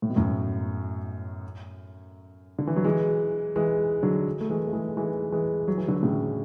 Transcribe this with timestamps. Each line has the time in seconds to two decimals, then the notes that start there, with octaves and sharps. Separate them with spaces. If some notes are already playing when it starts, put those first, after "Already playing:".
0.02 A2
0.10 B2
0.16 F#2 A2
2.59 D3
2.67 E3
2.76 F#3
2.84 E3 G#3
3.56 E3 G#3
4.03 D3 F#3
4.41 A3
4.50 E3 G#3
4.67 A3
4.73 E3 G#3
4.97 E3 G#3
5.32 E3 G#3
5.68 F#3
5.78 E3
5.88 D3 F#3
6.03 A2 C#3